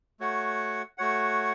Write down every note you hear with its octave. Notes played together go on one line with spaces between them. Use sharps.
A3 F#4 C#5 F#5
A3 F#4 C#5 F#5